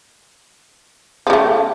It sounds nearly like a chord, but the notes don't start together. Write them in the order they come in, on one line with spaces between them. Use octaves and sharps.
F3 C#3 A3